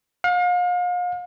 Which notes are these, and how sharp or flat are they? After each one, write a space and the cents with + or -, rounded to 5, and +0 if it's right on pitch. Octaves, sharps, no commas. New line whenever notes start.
F5 +40